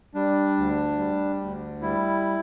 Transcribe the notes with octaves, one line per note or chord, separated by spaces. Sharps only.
G3 D4
D2
G3
D2
G3 E4